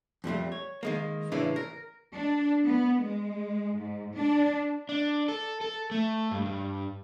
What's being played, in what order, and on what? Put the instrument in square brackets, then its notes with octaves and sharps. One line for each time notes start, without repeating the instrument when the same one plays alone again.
[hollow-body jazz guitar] F2 A#2 G3 A3
C#5
D#3 G#3 A#3
A2 C#3 E3 A#3 C#4 D4
A#4
[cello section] D4
B3
G#3
G#2
D4
[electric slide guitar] D4
A4
A4
A3
G2
G2